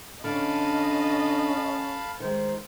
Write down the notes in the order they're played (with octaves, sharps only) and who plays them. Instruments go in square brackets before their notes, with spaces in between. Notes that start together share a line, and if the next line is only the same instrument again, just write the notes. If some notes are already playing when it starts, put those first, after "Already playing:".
[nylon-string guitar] D3 [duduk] C#4 [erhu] D#5 [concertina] F5 A5 B5
[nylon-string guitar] D#3 G#3 [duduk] C5